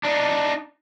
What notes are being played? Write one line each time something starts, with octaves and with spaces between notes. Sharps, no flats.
D4 D#4